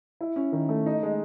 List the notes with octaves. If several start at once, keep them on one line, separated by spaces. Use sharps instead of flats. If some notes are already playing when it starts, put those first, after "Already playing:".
E4
C#4
D#3
A3
D#4
G#3